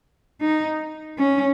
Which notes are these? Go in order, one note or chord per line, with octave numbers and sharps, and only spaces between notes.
D#4
C#4